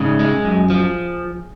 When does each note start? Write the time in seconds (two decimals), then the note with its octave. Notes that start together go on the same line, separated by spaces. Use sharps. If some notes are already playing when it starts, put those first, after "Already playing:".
Already playing: G#2 C#3 G#4
0.19 G#3
0.44 F#2
0.70 F3